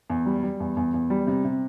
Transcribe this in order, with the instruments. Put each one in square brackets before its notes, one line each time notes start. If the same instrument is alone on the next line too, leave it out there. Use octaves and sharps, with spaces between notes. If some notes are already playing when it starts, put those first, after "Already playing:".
[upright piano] E2
G3
G3
E2
E2
E2
G3
C3
C3